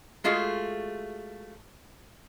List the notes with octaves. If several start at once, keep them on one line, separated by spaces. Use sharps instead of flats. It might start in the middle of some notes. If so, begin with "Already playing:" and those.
G#3 A3 F4 F#4 G#4